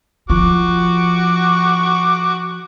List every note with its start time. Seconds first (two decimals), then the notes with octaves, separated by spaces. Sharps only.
0.30 F3 F#4 C#6 D6